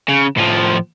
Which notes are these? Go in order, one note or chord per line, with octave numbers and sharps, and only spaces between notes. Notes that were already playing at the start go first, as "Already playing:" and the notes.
C#3
A2 F3